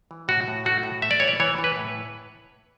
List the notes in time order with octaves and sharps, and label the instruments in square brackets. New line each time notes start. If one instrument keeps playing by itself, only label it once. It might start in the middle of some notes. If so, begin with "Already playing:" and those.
[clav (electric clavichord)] E3
A2 F#4
A2
A3 F#4
A2
A3 E5
D5
E3 C#5
D5
E3 C#5
E3
B4
A2